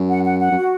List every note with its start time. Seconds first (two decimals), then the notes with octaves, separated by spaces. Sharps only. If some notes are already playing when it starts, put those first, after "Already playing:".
Already playing: F#2
0.08 F#5
0.24 F#5
0.40 F#5
0.51 F#2
0.56 F#4